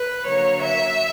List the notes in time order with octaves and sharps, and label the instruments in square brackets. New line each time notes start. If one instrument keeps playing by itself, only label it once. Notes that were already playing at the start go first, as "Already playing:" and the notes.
Already playing: [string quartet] B4
D3 F#3 A#3 C#5
E5